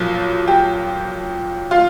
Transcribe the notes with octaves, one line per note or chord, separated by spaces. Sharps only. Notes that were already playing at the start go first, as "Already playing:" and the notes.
Already playing: B1 A#2 F3
G4
F4